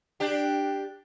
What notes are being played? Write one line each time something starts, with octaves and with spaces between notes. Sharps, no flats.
D4 G4